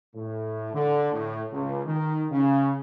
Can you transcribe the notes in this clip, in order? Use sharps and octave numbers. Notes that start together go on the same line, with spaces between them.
A2
D3
A2
C#2
D#3
C#3